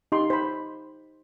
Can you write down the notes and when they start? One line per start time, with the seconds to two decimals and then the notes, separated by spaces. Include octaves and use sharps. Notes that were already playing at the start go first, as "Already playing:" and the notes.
0.12 D#4 G4 C6
0.30 C5 B5